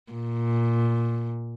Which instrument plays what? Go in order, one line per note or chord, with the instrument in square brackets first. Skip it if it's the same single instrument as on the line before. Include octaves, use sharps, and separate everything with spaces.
[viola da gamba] A#2